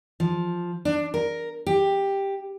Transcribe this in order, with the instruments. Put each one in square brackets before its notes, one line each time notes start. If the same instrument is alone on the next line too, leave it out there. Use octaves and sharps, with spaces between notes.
[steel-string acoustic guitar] F3
D4
A#4
G4